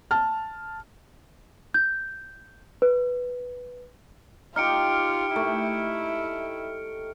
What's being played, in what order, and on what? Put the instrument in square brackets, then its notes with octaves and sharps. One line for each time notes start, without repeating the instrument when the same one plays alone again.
[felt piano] A5 F6
[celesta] G6
B4
[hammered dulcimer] D#4 G4 [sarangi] F4 [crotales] F6 C#7 D7
[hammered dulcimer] A3 [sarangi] E4